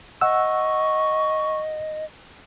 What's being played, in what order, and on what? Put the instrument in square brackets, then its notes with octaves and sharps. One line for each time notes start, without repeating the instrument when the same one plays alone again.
[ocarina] D#5 [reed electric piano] F#5 E6 [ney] C#6